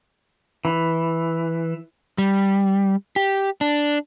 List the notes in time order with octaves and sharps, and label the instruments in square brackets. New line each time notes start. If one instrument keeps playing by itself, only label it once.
[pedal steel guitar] E3
[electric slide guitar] G3
G4
D4